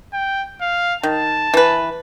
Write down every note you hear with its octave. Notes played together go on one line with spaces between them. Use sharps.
G5
F5
D#3 A5
E3 B4